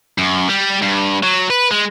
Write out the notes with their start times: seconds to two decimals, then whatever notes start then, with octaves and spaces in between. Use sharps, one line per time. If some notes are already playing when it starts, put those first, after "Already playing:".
0.18 F#2
0.48 G3
0.82 G2
1.23 F#3
1.50 B4
1.71 G#3